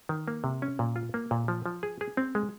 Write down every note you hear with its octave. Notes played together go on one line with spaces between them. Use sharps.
D#3
A#3
C3
C#4
A#2
F4
A#3
A#2
F3
F3
G#4
G#4
C4
G#3